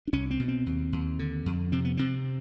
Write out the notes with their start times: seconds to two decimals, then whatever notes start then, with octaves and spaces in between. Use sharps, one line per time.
0.07 D4
0.13 C2 C#4
0.31 C4
0.40 B2
0.48 C4
0.66 D#2
0.92 D#2
1.19 D3
1.46 F2
1.72 C3 C4
1.85 B3
1.97 C3 C4